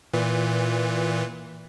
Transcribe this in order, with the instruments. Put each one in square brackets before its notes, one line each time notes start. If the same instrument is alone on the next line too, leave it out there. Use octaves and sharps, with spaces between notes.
[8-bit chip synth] A#2 E3